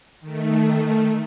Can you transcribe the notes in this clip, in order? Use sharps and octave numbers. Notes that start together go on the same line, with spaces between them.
D#3 A3